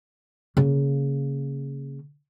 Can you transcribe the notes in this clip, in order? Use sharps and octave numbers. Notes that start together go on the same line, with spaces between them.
C#3 A#3